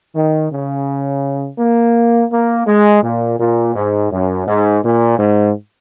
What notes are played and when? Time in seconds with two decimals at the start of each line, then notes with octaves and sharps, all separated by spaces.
0.14 D#3
0.51 C#3
1.59 A#3
2.30 A#3
2.66 G#3
3.01 A#2
3.38 A#2
3.74 G#2
4.10 F#2
4.45 G#2
4.82 A#2
5.17 G#2